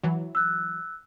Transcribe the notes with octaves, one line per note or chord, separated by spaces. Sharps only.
E3 F#3
E6 F#6